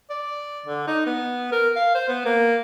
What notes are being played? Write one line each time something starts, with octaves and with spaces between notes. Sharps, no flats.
D5
D3
D#4
B3
A#4
F5
C5
B3
A#3